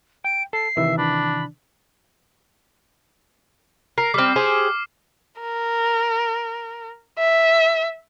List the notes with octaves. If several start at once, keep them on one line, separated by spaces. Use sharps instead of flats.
G5 D7
A4 C7
C3 D#3 E3 E5
D4 B5
A#4 C7
G3 C4 D6 F6
G4 G#4 C5
A#4
E5